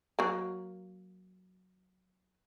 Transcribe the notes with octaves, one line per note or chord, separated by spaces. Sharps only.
F#3 A#3